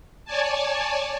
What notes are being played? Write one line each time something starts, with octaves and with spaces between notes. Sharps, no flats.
C#5 D5 G#5 A5